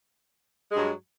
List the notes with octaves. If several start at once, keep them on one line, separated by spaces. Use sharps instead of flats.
G2 F#3 G#3